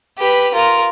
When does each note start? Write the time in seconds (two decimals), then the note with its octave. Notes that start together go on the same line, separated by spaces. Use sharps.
0.18 G4 B4
0.54 F4 A#4